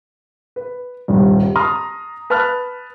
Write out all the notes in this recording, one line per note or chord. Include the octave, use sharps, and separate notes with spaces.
B4
D#1 C2 G2
A5 A#5 C6 D#6 F6
B4 A5 B5 F6 F#6